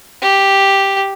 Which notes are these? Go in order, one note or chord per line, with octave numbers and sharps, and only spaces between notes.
G4